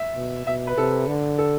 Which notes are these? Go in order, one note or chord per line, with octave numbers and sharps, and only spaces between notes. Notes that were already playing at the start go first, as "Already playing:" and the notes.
Already playing: E5
B2
B2 E5
B4
C3 A4
D3
A4